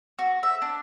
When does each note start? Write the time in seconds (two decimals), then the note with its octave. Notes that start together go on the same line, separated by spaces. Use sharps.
0.19 F#4
0.43 E5
0.62 D4